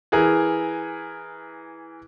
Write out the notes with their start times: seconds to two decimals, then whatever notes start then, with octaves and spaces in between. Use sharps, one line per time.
0.12 E3 G#4 A#4